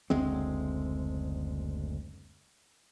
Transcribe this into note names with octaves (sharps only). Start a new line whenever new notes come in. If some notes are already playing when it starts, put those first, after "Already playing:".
F#1 D2 G#3 C4